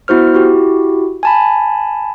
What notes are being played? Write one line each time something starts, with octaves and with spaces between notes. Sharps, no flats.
B3 E4 F#4 C5 F6
E4 F#4 G4
G#5 A5 B5